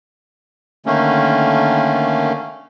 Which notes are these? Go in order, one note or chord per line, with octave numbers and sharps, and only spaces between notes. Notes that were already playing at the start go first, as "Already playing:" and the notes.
D3 D#3 A3 A#3 C#4